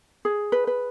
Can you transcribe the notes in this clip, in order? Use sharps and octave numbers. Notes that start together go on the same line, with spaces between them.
G#4
B4
B4